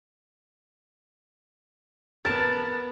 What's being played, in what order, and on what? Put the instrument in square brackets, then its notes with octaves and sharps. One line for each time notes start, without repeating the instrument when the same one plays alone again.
[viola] B3 [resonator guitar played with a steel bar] A#4 A5 [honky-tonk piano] A6